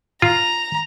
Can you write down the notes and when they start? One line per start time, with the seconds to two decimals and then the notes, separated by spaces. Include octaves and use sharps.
0.22 F4 A#5